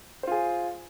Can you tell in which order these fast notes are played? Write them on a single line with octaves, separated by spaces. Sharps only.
C5 F4 G#4